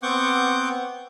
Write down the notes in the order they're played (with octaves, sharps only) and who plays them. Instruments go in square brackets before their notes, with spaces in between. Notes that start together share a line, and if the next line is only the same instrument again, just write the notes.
[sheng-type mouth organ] B3 C4 F#5 C#6 D6 G6